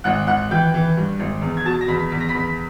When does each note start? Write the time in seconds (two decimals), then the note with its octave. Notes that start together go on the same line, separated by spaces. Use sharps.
0.04 G#1 F#5 F#6
0.27 G#1 F#5 F#6
0.51 E3 G5 G6
0.74 E3
0.97 G2
1.19 G#1
1.42 E2
1.57 G#6
1.65 B2 A5 A6
1.81 A#6
1.88 E2 B5 B6
2.10 E2 B6
2.20 A#6
2.29 B5 B6
2.34 E2